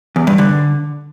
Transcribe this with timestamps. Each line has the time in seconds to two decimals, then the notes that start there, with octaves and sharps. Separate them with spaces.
0.16 E2
0.27 G2
0.38 D3